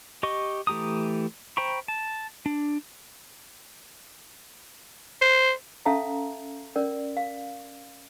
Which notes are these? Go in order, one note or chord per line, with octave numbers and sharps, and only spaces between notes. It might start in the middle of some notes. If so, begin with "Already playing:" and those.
G4 D#5 C#6
E3 A3 G4 A#5 D#6
C5 G5 A#5 B5 C#6
A5
D4
C5
C#4 A4 E5 F5 A5 A#5
C#4 A#4 D5
F5